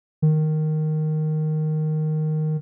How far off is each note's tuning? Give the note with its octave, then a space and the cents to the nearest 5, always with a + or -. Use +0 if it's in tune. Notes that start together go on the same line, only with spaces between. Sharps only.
D#3 -5